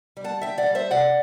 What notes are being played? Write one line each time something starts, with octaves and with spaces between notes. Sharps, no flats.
G3
F#5 A5
G3 E5 G5
D5 F#5
G3
C5 E5
C3 D5 F#5